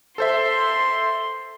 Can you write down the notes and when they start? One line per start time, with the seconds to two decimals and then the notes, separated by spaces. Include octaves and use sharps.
0.18 A4 C5 E5 C6